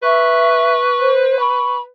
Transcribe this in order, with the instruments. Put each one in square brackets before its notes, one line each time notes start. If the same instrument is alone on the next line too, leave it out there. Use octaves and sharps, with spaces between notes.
[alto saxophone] B4 [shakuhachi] E5 [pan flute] C#6
[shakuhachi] C5
[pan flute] B5 [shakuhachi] C#6